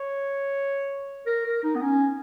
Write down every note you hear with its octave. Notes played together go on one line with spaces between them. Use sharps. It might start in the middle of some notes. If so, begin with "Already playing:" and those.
Already playing: C#5
A#4
A#4
D#4
B3
C#4